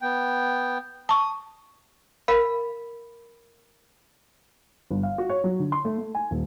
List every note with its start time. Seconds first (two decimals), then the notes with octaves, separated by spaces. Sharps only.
0.02 B3 G5
1.09 A5 C#6 D#6
2.28 A#4 F5 B5
4.91 G1
5.03 F5
5.18 F#4
5.29 C#5
5.44 F#3
5.60 D3
5.72 C6
5.85 A3
5.98 A3
6.15 G#5
6.31 D#1